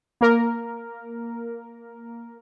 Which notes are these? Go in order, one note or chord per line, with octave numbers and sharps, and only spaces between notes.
A#3 A#4